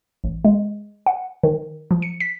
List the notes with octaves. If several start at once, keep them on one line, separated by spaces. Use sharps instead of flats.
A1
G#3
F#5
D#3
F3
C#7
B6